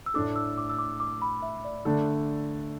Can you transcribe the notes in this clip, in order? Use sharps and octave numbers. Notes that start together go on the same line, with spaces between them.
E6
A2 A3 D4 A4 D6
E6
D6
E6
D6
D6
B5
E5
D5
D3 A3 D4 A4